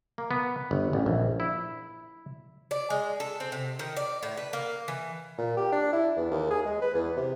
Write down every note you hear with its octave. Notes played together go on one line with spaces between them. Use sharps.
A#3
B3
G1
A1
A#1
E4
D5
G#3
A4
C4
C3
D#3
D5
A2
B4
A#3
E3
A#2
G4
D4
E4
E2
D#2
G#4
G#3
B4
E2
C3